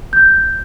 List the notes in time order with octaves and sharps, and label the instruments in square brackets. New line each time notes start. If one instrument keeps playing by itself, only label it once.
[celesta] G6